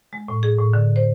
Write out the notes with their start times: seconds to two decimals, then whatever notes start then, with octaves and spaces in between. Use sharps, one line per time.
0.13 G#3
0.28 A2
0.43 G#4
0.58 A2
0.73 D3
0.96 C5